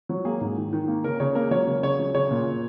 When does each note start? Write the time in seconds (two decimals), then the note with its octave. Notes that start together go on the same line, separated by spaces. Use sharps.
0.09 F#3
0.25 A#3 G#4
0.41 G#2
0.57 D#3
0.73 D#3
0.88 A#3
1.04 C#3 A#4
1.20 C#3 C#5
1.35 A#3 A#4
1.51 F#3 C#5
1.67 C#3
1.83 C#3 C#5
1.99 F#3
2.14 C#3 C#5
2.31 A#2
2.46 A#2